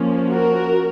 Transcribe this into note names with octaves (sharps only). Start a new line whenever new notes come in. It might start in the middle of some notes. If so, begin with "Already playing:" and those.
Already playing: F3 A#3 C#4
F#4 A#4